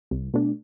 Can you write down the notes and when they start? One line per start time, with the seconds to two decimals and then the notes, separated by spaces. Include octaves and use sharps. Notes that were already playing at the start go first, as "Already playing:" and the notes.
0.11 C2
0.34 B2 A3 D4